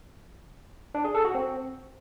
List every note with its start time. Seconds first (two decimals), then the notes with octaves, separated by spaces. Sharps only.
0.95 D4
1.05 G#4
1.15 A4
1.25 F#4
1.35 C4